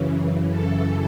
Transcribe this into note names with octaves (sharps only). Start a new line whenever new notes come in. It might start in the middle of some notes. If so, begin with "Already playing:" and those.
Already playing: F#2 C#3 E3
A4